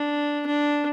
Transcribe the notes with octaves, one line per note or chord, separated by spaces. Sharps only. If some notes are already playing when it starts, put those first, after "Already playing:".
Already playing: D4
D4